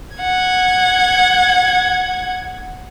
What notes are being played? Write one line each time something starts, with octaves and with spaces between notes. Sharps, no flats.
F#5 G#6